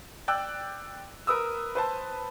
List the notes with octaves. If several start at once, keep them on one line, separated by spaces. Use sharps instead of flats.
D5 G5 D6 E6 F#6
A#4 B4 D#6 E6
B4 C5 A5